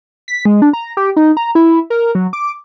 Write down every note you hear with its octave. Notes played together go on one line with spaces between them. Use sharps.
B6
G#3
D4
A#5
G4
D#4
A#5
E4
A#4
F#3
D6